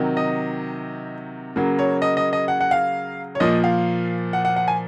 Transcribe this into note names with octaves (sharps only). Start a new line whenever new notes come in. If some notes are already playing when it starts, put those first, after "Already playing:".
Already playing: C3 D#3 F#3
D#5
C#3 F#3 A#3
C#5
D#5
D#5
D#5
F#5
F#5
F5
C#5
A#2 F3 A#3 D#5
F5
F#5
F#5
F#5
G#5